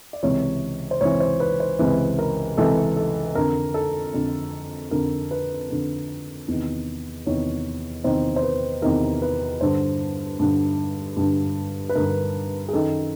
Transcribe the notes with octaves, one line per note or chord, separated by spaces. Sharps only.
D5
C#2 C3 E3 C#5
C5
C#2 C3 E3 C#5
C5
B4
C5
C#2 C3 E3 B4
A#4
C#2 C3 E3 A4
A4
F2 D3 A#4
A4
F2 D3
F2 D3 A#4
B4
F2 D3
E2 C3 D#3
E2 C3 D#3 C#5
E2 C3 D#3 C5
C5
B4
E2 C3 D#3 A#4
B4
G2 D3 C5
G2 D3
G2 D3
B4
G2 D3 A#4
G#4
F#2 D#3 A4